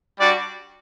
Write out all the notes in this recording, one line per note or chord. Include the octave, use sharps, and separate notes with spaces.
G3 D4 F#4 D5